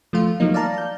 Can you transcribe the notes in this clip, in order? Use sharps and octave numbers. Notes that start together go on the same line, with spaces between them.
F3 A3 F4
F3 F#3 A#3 D#4
D5 F5 A5 A#5
G6